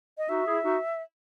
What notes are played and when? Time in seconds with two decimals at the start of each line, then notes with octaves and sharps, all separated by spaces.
0.18 D#5
0.29 D#4 F#4 E5
0.46 E4 G#4
0.64 D#4 F#4